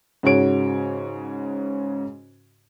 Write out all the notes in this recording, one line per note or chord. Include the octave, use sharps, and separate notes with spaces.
G#2 C#3 F#4 C#5 D7